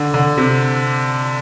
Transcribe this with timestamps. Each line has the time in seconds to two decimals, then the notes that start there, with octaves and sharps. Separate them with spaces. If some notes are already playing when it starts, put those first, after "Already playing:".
Already playing: D3
0.14 D3
0.37 C3